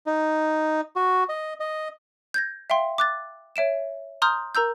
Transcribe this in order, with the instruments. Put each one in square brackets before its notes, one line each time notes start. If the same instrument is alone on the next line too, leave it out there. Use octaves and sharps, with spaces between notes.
[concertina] D#4
F#4
D#5
D#5
[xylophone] G6 G#6 A#6
E5 F5 G5 C6
D6 F#6 A6
C#5 E5 D7 E7
A#5 C6 D#6 F6 G6
A#4 A#5 E6 G6